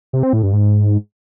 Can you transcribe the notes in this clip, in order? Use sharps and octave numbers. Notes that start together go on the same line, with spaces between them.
C3
C4
A2
G2
G#2